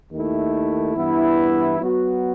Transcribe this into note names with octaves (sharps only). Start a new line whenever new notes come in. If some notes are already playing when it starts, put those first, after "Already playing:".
D#2 D#3 A3 E4
G2 E3 B3 E4
F#3 B3 F#4